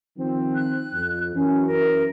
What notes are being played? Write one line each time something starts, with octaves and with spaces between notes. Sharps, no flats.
D#3 F3 C4
F#6
F2
F#2 E3 C#4
A#4